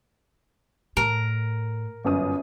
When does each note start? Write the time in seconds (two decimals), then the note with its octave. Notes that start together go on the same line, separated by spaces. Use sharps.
0.97 A2 A#4
2.04 G1 F#2 D#6